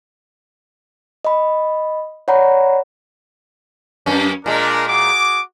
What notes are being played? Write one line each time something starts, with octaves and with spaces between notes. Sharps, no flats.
D#5 B5
C#5 D5 F#5 A#5 B5
F#2 A#3 C#4
A#2 G#3 D4 A#4
F#4 G#4 D6